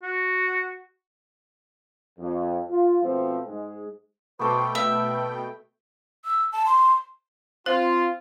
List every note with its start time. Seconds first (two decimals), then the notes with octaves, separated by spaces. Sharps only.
0.03 F#4
2.18 F2
2.69 F4
3.02 B2 F3 A3 B3 C4
3.47 G#2 G#3
4.39 B2 A3 B3 A4 C5 G5 C#6 D6
4.75 E5 B5
6.25 E6
6.52 A5
6.65 C6
7.66 C4 F4 C5